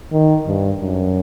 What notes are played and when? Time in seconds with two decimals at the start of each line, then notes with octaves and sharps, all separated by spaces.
0.12 D#3
0.47 G2
0.80 F#2